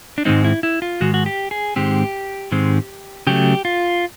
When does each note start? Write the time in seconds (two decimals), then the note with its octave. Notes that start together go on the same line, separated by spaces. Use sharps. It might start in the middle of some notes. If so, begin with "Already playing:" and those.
0.18 D4
0.25 G#2 D#3 G#3 C4 D#4
0.45 E4
0.63 E4
0.82 F4
1.01 G#2 D#3 G#3 F#4
1.14 F#4
1.26 G4
1.51 G#4
1.76 G#2 D#3 G#3 C4 G4
2.52 G#2 D#3 G#3 C4
3.27 C#3 F#3 A3 G4
3.65 F4